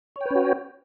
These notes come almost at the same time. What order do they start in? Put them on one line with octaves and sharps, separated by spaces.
C#5 G5 B4 C#4 F#4